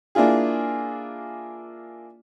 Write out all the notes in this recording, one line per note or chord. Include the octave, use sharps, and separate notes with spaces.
A#3 D4 E4 F4 G#4